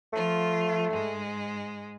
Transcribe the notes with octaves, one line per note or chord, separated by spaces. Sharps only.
F3 A3 F4
G#2 G#3